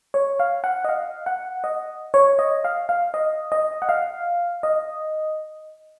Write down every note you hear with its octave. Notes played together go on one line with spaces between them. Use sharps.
C#5
F5
F#5
D#5
F5
F#5
D#5
C#5
D#5
F5
F5
D#5
D#5
F#5
F5
D#5